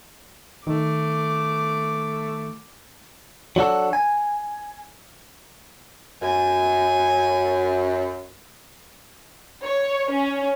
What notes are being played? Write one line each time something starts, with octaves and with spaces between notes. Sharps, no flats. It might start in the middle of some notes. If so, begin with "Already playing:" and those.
D#3 A3 D6
F#3 D4 F#4 A4
G#5
F#2 G#5
C#5
C#4